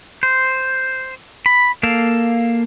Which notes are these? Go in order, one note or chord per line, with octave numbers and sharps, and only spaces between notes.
C5
B5
A#3 A4 F5